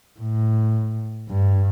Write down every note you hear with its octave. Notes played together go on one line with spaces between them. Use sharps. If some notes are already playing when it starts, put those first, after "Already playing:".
A2
G2